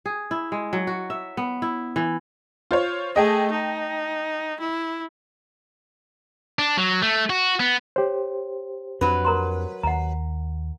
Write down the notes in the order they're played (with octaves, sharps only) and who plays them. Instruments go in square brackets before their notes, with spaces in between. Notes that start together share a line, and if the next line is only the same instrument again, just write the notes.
[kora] G#4
E4
G#3
F#3
F#4
E5
B3
E4
E3
[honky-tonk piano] F4 C5 C#5
[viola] A3 G#4 [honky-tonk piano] D#5 G5 A5
[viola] D#4
E4
[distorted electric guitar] D4
F#3
A3
F#4
B3
[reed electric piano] G4 C5 [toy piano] C#5
[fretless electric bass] F2 C4 D4 [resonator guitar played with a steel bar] F#3 B4
[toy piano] A#4 A#5 C6
[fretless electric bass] D#2 [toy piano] F#5 A#5